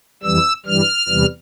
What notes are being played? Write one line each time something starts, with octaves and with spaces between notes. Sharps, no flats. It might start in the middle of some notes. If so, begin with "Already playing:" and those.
F2 E3 G3 E6
G2 E3 G3 F6
E2 C3 E3 G3